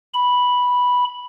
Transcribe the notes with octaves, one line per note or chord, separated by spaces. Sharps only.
B5